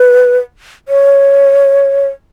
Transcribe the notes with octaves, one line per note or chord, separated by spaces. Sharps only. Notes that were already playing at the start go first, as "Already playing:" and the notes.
Already playing: B4
C#5